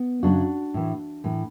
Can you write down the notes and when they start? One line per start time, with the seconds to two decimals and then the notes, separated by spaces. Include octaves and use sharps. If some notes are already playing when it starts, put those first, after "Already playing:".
Already playing: B3
0.23 F#2 C#3 F#3 D4 F#4
0.74 A2 E3
1.24 A2 E3